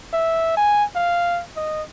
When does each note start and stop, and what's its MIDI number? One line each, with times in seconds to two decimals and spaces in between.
0.13 0.55 76
0.57 0.84 80
0.96 1.42 77
1.56 1.83 75